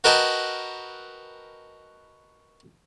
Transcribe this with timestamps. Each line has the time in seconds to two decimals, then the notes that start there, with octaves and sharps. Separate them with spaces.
0.04 F#4 A#4 B4 D#5 G5 A5